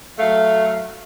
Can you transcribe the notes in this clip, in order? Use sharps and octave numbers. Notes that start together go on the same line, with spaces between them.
F#3 A3 F5